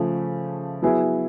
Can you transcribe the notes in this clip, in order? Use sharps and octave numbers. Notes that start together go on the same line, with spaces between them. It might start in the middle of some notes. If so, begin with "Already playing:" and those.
Already playing: C#3 F3 A3
F#3 B3 E4 G#4